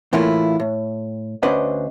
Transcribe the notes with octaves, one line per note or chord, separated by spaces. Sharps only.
A2 E3 A3 A#3 E4 F4
A2
D2 C#4 D4 B4 C5 D#5